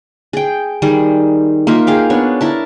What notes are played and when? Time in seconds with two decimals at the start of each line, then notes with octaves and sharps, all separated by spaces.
0.33 G#4 G5
0.82 D#3 G3 G#4
1.67 A#3 D#4 F4 E5
1.87 G#4 F5 G5
2.10 B3 D4 C#5
2.41 E4 A#4 A5